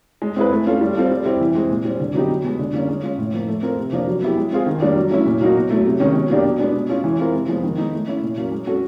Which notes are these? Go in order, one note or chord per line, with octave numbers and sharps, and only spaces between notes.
G#3
C4 E4 G#4 B4
A3
C#4 F4 A4
G3
C4 F4 A4
G3
C4 E4 G4
E3
G#3 C4
A#2
G3 C4
D3
F#3 B3 D#4 G4
B2
G#3 B3
D3
G3 A#3 C#4
G#3
C#4 F4
A2
F3 A#3
A3
C4 F4 A#4
C3
F3 A#3 D4
F#3
B3 E4 G4
G#3
C4 F4 G#4
D#3
G3 A#3 D4
F#3
A3 C#4 E4
A#2
F#3 A#3 D#4 F#4
B2
F#3 A3
C3
D#3 G#3 C#4
B2
F#3 A#3 D4 G4
B2
G#3 B3 D4
B2
G#3 C#4 F4
E3
G#3 C4 F4 A#4
C3
F3 G#3 B3
D#3
G#3 B3 D#4
A3
C#4 E4
A#2
F#3 A#3 C#4
G#3
C#4 F#4 A4